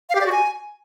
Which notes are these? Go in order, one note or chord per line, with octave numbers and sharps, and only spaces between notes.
F5
G4
D5
F#4
G#5